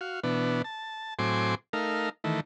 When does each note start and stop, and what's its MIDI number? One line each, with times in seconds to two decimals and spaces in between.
0.01 0.20 66
0.01 0.20 77
0.23 0.62 47
0.23 0.62 52
0.23 0.62 59
0.23 0.62 62
0.64 1.14 81
1.19 1.55 45
1.19 1.55 54
1.19 1.55 60
1.19 1.55 80
1.19 1.55 84
1.19 1.55 86
1.73 2.09 57
1.73 2.09 63
1.73 2.09 70
1.73 2.09 77
2.24 2.40 51
2.24 2.40 52
2.24 2.40 57